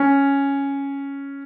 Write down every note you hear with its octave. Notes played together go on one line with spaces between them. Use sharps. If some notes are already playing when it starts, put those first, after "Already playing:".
Already playing: C#4